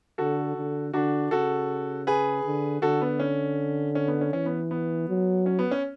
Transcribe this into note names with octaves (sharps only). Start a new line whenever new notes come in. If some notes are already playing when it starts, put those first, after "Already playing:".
D3 F#4 A4
D3
D3 D4 F#4
C#3 F#4 A4
G#4 B4
D3
D3 F#4 A4
B3
C#4
C#4
B3
C#4
E3 C#4
B3
B3
F#3
C#4
B3
C#4